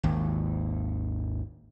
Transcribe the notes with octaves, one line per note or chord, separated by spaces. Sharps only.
G#1 D#2